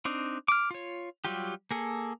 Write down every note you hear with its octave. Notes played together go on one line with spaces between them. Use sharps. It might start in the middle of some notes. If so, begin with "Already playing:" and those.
C4 D4 D#4
D6 F6
F4 C#5
F#3 G3 F4 G4
A#3 G#4 A4